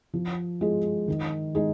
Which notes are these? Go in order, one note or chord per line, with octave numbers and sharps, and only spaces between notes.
F3
G#3 F4 G#4
D#3
G#3 D#4 G#4